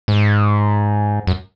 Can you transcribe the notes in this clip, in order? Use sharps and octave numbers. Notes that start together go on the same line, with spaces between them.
G#2
F#2